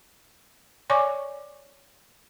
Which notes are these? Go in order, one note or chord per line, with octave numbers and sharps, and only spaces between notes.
C#5 D5 G#5 C#6 D6